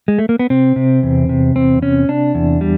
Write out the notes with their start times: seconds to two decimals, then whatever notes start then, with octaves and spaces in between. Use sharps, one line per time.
0.08 G#3
0.19 A3
0.29 A#3
0.39 B3
0.50 C3 C4
0.76 C3
1.03 E2
1.29 C3
1.56 E2 C4
1.82 C3 C#4
2.08 C3 D4
2.35 E2
2.61 G3